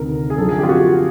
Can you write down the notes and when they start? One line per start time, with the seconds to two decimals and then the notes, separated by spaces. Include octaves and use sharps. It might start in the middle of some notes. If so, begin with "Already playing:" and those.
Already playing: D2 C3 D#3 A#4
0.30 G#4
0.38 F#2 D3 F3 A4
0.49 G#4
0.59 G4
0.63 F4
0.69 F#4